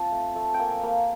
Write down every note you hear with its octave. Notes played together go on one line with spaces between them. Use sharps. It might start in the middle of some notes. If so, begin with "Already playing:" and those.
Already playing: C4 F4 A5
A3
A3
G5
A#3 G#5
A#3